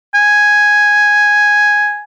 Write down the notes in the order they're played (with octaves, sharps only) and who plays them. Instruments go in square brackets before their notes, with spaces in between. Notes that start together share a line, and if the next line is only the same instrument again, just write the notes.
[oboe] G#5